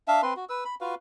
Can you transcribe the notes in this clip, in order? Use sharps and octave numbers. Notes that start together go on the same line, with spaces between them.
D4 E5 F5
C4 B4 C6
F#4
B4 E6
B5
F4 F#4 B4 F5